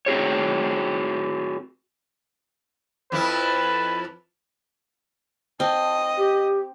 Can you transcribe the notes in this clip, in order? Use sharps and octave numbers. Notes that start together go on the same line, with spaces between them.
C4 F#4 G#4 C#5
F2 F3 E4 B4
C4 D#5 A5
G4